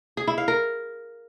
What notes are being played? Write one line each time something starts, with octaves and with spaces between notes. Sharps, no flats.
G#4
E4
F5
A#4